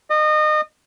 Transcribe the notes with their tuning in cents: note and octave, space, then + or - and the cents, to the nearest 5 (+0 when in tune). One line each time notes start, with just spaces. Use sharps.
D#5 -30